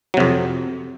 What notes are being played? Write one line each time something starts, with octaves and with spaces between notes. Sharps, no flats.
F2 C3 F#3